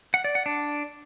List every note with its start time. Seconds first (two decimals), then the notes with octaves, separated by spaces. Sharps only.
0.14 F#5
0.24 D5
0.35 F#5
0.46 D4